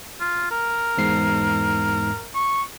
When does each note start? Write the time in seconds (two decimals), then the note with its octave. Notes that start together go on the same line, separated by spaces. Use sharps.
0.21 F4
0.51 A#4
0.98 E2 G#2 C7
2.35 C#6